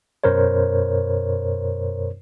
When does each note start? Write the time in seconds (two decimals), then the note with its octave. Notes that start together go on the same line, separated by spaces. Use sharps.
0.24 F#2 B2 A#4 C5 C#5